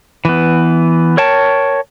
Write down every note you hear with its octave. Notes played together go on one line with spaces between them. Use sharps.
E3 B3
A#4 C#5 G5 A5